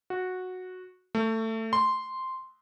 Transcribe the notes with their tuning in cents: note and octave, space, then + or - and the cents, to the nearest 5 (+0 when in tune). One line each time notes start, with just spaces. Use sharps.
F#4 -10
A3 +20
C6 -5